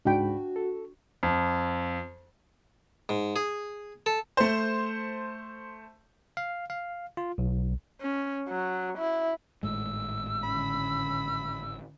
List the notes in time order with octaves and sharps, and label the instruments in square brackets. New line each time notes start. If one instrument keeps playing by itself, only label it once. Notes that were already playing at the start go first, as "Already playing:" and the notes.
[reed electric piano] C#2 G#2 B5 [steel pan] D4 G5 [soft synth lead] F#4
[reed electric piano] A4
[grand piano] F2
[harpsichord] G#2
G#4
A4
[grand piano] A3 C5
[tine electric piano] F5
F5
F4
B1
[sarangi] C#4
F#3
E4
[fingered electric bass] G#1 A2 G#3 [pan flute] E6
[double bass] D3 C#4 [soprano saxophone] B5